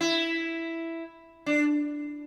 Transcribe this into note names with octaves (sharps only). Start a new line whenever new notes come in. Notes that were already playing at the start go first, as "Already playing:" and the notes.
E4
D4